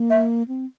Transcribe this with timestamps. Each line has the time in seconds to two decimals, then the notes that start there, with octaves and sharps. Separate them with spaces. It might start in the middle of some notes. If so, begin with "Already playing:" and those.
Already playing: A#3
0.10 E5
0.48 C4